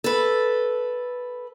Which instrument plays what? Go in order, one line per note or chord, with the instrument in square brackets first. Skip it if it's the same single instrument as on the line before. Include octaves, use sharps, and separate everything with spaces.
[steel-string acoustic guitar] A4 B4